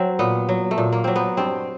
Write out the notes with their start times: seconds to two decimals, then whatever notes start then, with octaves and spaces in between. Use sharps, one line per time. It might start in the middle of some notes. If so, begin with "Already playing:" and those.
Already playing: F#3 C4
0.19 A#2 B3
0.49 F#3
0.71 A3
0.78 A#2
0.92 A#3
1.04 F#3 C4
1.16 B3
1.37 G2 C4